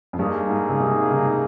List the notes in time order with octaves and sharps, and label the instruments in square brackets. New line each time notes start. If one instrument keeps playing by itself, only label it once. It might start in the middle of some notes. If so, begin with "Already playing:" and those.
[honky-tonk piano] F2
[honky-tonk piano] G2 [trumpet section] A#3 D#4 G#4
[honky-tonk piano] G#2
C#3
C3
C#3